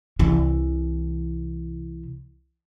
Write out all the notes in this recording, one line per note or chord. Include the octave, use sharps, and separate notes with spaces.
C2 E3